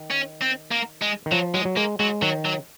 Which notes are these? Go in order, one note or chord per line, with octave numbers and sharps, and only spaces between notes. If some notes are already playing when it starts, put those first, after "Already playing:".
Already playing: D#3
C#4
C4
A#3
G#3
D#3
F3 F#3
F#3 G#3
F#3
G#3 A#3
F#3 G#3
D#3 F#3
F#3